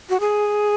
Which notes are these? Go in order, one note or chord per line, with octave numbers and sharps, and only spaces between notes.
F#4
G#4